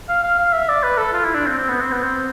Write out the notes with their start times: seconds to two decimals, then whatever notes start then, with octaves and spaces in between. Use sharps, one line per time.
0.09 F5
0.23 F5
0.38 F5
0.53 E5
0.69 D5
0.83 B4
0.98 A4
1.13 F4
1.24 E4
1.35 D4
1.46 C4
1.57 C4
1.69 B3
1.81 C4
1.92 B3
2.02 C4